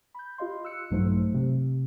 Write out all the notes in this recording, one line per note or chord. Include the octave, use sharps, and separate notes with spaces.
B5 G6
F4 G4 D#5 F5 C6
E6 F#6 C#7
A#1 G2 F#3 A3 D#4 C5
C3